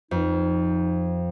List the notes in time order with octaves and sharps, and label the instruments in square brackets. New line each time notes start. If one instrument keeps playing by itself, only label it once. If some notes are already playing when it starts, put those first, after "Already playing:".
[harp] F2 [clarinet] D#4